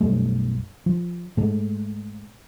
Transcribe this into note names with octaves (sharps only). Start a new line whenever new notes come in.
B1 F#2 G3 A3
F3
G#2 G#3 A3